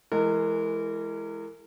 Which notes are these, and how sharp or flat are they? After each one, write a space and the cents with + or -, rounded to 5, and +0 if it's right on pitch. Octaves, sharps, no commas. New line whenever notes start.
E3 +10 G#3 +10 A#4 -30